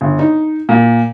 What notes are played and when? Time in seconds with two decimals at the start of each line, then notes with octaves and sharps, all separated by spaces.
0.01 G1
0.19 D#4
0.69 A#2